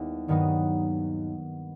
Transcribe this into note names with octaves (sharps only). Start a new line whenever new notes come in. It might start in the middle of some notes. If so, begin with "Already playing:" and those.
Already playing: D#2 D#3 G3 B3 E4
G2 D#3 F#3 B3 D#4